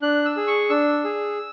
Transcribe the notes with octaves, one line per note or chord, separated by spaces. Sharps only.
D4 F#6
E6
G#4
C#6
D4 E6
G#4